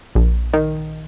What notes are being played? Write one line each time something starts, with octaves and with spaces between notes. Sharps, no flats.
A#1
D#3